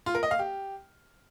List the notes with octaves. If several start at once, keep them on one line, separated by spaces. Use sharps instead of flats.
F4
A#4
D#5
F5
G4